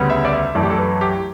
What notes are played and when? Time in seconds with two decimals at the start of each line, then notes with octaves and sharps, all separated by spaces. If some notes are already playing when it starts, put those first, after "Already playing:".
Already playing: D2 C#3 G3 B3
0.10 E5
0.25 D5
0.33 E5
0.55 F#2 E3 A3 D5
0.63 G4
0.70 A4
0.78 B4
1.01 G4